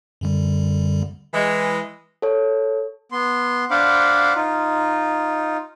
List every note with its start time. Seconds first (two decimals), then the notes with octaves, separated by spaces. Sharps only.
0.21 F#2 D3 G3
1.34 E3 G#3
2.22 A4 C#5
3.12 B3 C6
3.71 D4 C5 F5 F#5 B5 D6
4.35 D#4 F4